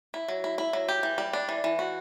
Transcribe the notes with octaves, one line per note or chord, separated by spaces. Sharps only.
E4
F#3
E4
E4
F#3
G4
E3
G3
D4
E3
E3
F#4